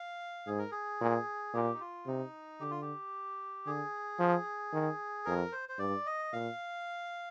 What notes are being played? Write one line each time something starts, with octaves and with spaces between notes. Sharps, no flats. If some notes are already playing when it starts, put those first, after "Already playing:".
Already playing: F5
G#2 G#4
A#4
G#4
A#2
A#2 G4
D#4
F4
C3 D#4
D3 G4
F4
G4
D3 G#4
F3
D#3
F2 A#4
C5
C5
G2 D5
D#5
A#2 F5